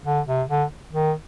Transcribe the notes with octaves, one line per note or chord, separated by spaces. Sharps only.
D3
C3
D3
D#3